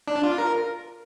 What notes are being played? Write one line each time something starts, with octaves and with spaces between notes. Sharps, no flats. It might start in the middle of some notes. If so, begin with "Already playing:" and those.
D4
F4
A#4